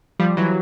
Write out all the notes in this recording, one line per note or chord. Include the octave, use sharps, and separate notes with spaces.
F3 G3
E3 F#3